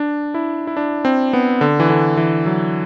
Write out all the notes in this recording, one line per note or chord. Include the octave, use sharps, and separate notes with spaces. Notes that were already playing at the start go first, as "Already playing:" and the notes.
Already playing: D4
E4
E4
D4
C4
B3
D3
E3
D3
E3
F#3